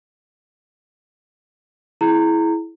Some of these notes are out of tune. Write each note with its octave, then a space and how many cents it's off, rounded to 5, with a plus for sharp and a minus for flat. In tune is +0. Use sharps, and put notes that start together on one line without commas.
E4 +0 G#4 +35 A#5 -20